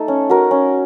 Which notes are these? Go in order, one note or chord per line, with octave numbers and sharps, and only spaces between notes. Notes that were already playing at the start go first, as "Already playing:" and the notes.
Already playing: A3 D#4 A4
C#4
F#4 A#4
C#4